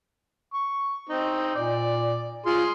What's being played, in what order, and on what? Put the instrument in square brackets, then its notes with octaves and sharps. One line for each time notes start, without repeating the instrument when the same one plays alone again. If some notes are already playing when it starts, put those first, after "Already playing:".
[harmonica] C#6
C4 D#4
[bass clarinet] A#2 [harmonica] D5
[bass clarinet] F4 [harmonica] G#4 C6